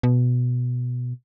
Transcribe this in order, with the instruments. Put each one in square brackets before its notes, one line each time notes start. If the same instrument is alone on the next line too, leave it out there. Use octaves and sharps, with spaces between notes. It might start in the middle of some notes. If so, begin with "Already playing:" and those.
[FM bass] B2